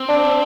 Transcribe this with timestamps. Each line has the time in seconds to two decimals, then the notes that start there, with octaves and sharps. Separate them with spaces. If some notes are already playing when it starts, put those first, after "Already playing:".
Already playing: C4
0.09 D4